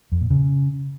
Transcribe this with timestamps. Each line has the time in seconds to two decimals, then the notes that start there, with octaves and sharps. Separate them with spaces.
0.12 F2
0.21 A#2
0.30 C#3